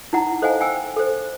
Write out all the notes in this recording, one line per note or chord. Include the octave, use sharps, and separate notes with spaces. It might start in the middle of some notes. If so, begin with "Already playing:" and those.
D#4 E4 F#5 A#5
A4 C5 D#5 F5 F#5 G#5
F5 G5 G#5 E6
A4 C5